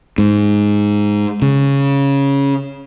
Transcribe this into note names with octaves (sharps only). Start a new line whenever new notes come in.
G#2
C#3